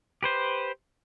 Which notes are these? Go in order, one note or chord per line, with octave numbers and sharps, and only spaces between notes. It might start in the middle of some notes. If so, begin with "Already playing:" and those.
G4 B4 C5